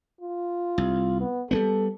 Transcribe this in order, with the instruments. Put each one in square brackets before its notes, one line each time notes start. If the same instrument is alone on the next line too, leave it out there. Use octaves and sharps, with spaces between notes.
[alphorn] F4
[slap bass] C2
[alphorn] B3
[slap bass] G3 A3 B3 [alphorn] A4